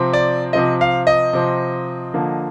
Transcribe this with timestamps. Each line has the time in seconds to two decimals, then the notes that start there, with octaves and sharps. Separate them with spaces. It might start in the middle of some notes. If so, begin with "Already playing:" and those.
Already playing: C3 F3 C4
0.14 D5
0.53 C3 F3 C4 D#5
0.81 F5
1.07 D#5
1.33 C3 F3 C4
2.14 D3 F3 A#3